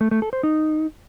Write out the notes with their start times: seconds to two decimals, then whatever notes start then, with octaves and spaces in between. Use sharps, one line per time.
0.01 A3
0.11 A3
0.22 A4
0.33 C5
0.43 D#4